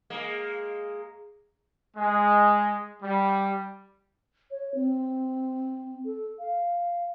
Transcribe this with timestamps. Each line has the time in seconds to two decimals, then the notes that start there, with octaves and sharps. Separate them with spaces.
0.10 G#3 A#3
1.97 G#3
3.03 G3
4.51 C#5
4.75 C4
6.05 A4
6.39 F5